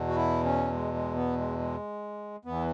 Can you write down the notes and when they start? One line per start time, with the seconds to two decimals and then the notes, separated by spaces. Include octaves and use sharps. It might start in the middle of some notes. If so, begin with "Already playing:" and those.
Already playing: E2 B2
0.08 F#4
0.15 E4
0.44 C#4
0.73 G#3
0.94 G#3
1.15 B3
1.37 G#3
1.59 G#3
2.45 E2 E3 B3